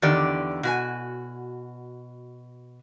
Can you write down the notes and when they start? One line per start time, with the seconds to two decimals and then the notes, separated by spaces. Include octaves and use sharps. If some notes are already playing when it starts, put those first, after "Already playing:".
0.02 E2 D3 D#3 G4 D5
0.63 B2 F#4 G#5